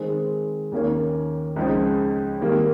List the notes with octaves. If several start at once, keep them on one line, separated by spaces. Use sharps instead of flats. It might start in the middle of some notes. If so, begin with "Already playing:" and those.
Already playing: D#3 G#3 C4
D#2 D#3 A#3 C#4
C#2 C#3 F3 G#3 D#4
D#3 G3 A#3